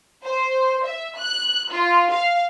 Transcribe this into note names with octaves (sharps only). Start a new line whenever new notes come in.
C5
E5
F#6
F4
F5